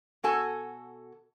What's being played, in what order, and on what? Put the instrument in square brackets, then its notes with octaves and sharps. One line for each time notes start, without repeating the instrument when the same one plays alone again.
[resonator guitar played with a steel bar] B2 F#4 A4 G#5